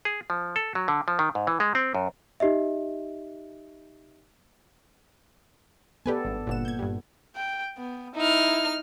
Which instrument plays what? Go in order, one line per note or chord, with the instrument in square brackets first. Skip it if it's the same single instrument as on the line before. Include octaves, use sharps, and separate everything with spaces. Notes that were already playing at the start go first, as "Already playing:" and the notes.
[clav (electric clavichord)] G#4
F3
A4
F#3
D3
F3
D#3
G#2
E3
G#3
C4
F#2
[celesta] D#4 G4 D#5 E5
[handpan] B3 A4 D5 [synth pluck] G4 B4 G#5
[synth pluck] G#1 G2
[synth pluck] G1 G2 E7 [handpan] A#2 F#5
[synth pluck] G6 G#6
G2 G3
[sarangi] G5
B3
[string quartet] D#4 F6 [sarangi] E4